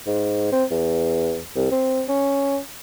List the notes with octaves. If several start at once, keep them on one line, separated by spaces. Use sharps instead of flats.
G#2
C4
E2
C2
C4
C#4